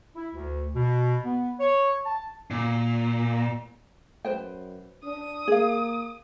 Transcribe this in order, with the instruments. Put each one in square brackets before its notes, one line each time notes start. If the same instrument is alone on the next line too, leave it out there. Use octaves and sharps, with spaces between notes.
[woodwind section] E4
D2
B2
B3
C#5
A5
[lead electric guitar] A#2
[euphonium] F#2 [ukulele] B4 C5 G5
[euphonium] D4 [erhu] D#6
[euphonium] A#3 [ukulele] G#4 F5